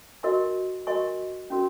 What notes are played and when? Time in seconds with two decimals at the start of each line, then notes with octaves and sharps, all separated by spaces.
0.23 F#4 A#4 D#5 G#5 C#6
0.87 F#4 A#4 D#5 G#5 C#6
1.50 C#4 F#4 A#4